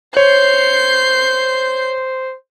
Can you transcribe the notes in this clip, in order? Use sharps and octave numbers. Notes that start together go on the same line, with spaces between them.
C5 C#5 G6 C7